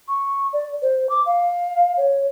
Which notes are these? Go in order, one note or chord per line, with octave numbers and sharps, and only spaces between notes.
C#6
D5
C5
D6
F5
C#5